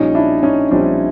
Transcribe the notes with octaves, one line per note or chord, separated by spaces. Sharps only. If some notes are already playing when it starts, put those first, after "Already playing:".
Already playing: A#1 A#2 G3 C#4 D#4
D4 E4
C#4 D#4
A#1 A#2 G3 C4 D4